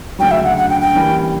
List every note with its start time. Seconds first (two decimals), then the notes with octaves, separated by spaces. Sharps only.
0.19 D2 C#3 F#3 G5
0.31 E5
0.44 F#5
0.57 F#5
0.70 G5
0.81 G5
0.94 E3 G3 A#3 C#4